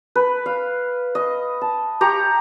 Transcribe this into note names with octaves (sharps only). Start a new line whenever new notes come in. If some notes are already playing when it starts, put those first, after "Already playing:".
B4
F5
D#5
A5
G4 A#5 C#6